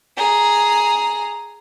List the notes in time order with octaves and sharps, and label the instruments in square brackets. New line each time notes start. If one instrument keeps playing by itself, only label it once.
[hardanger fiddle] G#4 A#5